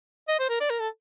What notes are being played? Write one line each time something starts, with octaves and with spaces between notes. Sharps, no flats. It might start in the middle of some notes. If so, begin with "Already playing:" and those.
D#5
C5
A#4
D5
A#4
A4